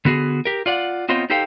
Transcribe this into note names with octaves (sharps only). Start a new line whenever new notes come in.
D3 B3 F#4 G#4
G4 A#4
F4 D5 F#5
B3 C4 F4 C5 C#5 D#5
D#4 G4 A4 C5 F5 G5